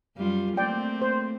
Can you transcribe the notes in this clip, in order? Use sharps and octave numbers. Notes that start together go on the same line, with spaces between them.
F#2 G3 F4
A3 A#3 C4 D5 G5
C5